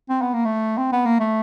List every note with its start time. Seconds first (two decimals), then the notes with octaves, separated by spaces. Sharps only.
0.09 C4
0.22 B3
0.34 A#3
0.45 A3
0.78 C4
0.92 B3
1.06 A#3
1.20 A3